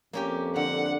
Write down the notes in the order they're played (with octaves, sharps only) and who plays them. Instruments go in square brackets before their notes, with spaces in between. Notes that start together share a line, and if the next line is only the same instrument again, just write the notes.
[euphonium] F2 [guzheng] A#3 C#4 G4
[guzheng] D3 [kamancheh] F#5